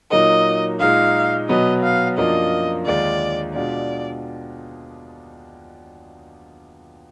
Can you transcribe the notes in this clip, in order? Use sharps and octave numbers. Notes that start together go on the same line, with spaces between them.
A#2 F#3 A#3 D#4 D#5
A#2 G#3 D#4 F5
B2 F#3 B3 D#5
F5
F#2 F3 A#3 D4 F4 D#5
D#2 D3 G#3 D4 F4 D5
B2 G#3 D4 F4 D5